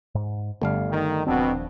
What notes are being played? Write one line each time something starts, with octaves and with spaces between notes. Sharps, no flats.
G#2
G1 G3 A3 F5
D#3
D#1 B2 D3 F3 C4 D4